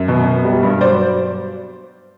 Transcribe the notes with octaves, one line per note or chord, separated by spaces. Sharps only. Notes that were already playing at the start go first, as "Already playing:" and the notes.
Already playing: F#2
B2
B2
G3
G2
F#3 C5 D5